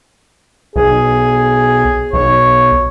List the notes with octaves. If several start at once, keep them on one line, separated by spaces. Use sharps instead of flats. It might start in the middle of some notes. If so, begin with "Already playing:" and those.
B1 G#4
B1 C#5